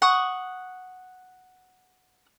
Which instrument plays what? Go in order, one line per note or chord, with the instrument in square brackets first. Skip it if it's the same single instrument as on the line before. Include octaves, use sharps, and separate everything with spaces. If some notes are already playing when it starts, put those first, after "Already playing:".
[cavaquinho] F#5 C#6 D#6